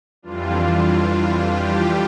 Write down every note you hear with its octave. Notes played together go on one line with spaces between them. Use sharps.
F2 E3 G3 D4 F4
F4
G4